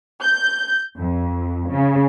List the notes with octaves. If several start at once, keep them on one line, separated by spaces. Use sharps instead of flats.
G6
F2
C#3